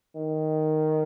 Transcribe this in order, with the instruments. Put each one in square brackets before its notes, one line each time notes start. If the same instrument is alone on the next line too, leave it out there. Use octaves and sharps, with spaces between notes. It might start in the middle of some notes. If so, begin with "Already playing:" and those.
[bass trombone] D#3